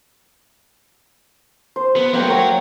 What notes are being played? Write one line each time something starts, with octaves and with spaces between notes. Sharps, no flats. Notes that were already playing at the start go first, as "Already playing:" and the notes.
C5
B3
F#3 A3 A#3 G5
F#3 F#4 A#4 C#5 F#5